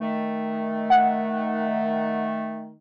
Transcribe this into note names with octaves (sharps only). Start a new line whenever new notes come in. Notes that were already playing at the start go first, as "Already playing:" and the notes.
D#3 A3
F#5